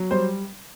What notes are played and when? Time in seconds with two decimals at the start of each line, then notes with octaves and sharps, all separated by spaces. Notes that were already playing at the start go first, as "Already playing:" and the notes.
Already playing: F#3
0.11 G3 C5